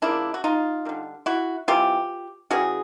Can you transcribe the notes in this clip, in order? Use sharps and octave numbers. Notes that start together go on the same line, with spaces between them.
C#3 F3 A#3 D4 E4
F#4
D#4 F4
D3 G3 A#3
E4 F#4
C3 E3 G3 F4 G4
C#3 E3 G3 F#4 G#4